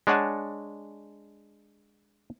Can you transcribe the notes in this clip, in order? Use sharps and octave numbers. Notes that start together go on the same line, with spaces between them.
G#3 D4 C#5 F#5 G#5 A5